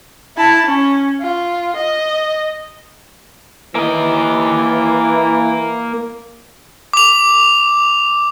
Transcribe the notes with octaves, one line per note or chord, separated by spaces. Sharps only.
E4 A5
C#4
F4
D#5
E3 A#3 D#5
D6 F7